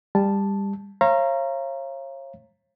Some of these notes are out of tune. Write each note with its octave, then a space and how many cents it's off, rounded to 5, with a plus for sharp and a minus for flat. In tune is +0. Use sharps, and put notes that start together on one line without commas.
G3 +20 A5 +0
C#5 -40 F5 -35 A#5 +0